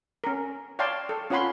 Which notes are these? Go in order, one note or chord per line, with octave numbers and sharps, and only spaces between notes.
C#4 A#4
C#5 D5 F5 G5 A5 C6
A4
C#4 F4 C#5 F#5 B5 C6